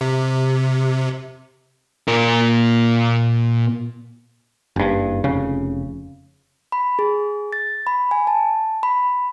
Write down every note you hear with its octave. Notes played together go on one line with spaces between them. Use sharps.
C3
A#2 A#4
F#1 G2
F1 C#3
B5
G#4
A6
B5
G#5
A5
B5